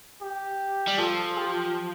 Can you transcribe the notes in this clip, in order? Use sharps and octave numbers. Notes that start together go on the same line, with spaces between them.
G4
G3
F3 A4
G4